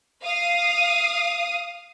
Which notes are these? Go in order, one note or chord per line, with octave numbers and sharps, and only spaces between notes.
F5 D#6